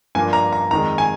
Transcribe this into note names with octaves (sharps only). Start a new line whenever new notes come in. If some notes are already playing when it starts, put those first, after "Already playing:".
G2 F3 A#3 D4 G#5
A#5
A#5
F2 D#3 G#3 A#5
G#5